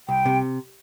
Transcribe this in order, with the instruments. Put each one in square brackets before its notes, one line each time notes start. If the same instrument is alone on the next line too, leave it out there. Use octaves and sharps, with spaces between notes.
[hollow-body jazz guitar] C2 [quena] G5
[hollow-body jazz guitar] C3